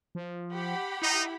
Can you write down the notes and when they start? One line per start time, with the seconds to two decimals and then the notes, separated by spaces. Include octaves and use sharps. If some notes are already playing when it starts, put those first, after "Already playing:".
0.15 F3
0.54 G4 F#5 B5
1.02 D#4 E4